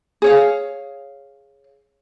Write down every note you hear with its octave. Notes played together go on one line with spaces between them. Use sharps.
G#4 C#5 F5